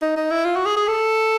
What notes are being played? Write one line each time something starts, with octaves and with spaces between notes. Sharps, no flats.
D#4
D#4
E4
F4
F#4
G#4
G#4
A4